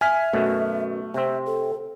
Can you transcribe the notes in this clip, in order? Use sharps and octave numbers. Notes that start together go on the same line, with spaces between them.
E5 G#5 F6 B6
F#2 B2 A3
C3 C4 E5
A4